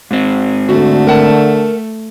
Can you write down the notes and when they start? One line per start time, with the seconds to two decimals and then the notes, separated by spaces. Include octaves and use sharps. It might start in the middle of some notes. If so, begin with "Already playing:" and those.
0.11 G#2 C4
0.69 D3 A3 F#4
1.07 A#4 F#5 A5